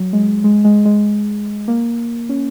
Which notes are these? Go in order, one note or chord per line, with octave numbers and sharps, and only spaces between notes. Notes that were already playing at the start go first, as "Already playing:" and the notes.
Already playing: F#3
G#3
G#3
G#3
G#3
A#3
C#4